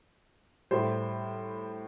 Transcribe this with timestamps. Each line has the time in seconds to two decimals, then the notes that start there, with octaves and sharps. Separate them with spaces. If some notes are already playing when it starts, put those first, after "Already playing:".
0.71 A2 G3 C5